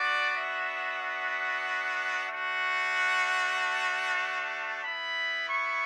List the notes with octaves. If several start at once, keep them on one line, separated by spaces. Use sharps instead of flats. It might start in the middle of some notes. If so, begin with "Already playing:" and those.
Already playing: B3 D4 F#4 D5
E5
E5
A3 D4 F#4 F#5
A5
B3 E4 B5
C#6